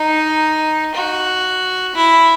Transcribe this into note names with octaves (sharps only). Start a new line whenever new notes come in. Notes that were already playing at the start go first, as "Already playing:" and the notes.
Already playing: D#4
F#4
E4